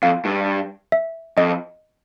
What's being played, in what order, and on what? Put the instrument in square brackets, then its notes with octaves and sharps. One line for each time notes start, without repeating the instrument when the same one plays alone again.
[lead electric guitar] F2 [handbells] F5
[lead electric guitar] G2
[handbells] E5
[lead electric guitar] F2 [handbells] D#5